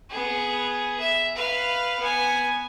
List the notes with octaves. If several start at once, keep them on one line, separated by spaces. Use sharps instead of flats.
B3 G#4
E5
B4 F5
B3 G#5